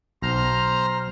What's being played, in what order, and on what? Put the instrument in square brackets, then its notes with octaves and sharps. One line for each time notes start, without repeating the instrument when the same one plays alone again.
[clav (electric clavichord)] B1 [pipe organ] C5 A#5 F6